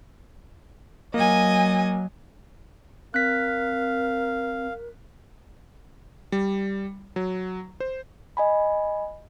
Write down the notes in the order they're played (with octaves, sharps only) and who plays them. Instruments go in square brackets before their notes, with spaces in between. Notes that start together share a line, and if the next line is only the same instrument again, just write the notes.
[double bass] F#3 [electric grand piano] A#3 [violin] D#5 G#5
[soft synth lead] C4 [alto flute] A#4 [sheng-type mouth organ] F5 [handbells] F#6 B6
[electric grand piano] G3
F#3
C5
[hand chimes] D#5 G#5 B5